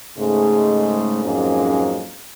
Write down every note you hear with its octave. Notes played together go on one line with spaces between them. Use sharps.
G#2 C#3 G#3 A3
F2 G#2 F#3 G#3 A#3 C#4